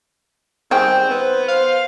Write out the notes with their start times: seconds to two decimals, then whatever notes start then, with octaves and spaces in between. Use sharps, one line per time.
0.71 D#3 G3 C4 G#4 G5
1.09 B3 C5
1.48 C5 F5